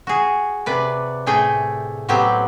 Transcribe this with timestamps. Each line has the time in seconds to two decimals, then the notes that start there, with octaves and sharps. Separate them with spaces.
0.07 F#4 G#4
0.66 C3 B4 D5
1.26 A2 A3 G#4 G5
2.09 A2 F#3 B3 C4 G4